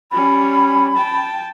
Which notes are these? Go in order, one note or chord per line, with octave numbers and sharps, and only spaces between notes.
G3 C#4 B5
G5 A5